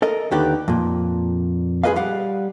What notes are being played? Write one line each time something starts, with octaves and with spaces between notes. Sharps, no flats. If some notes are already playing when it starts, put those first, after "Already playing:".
A4 A#4 D#5
D#2 D3 D#4 G4 B4 D5
F2 A#2
F4 G#4 A#4 B4 D#5 F5
G3 F5 F#5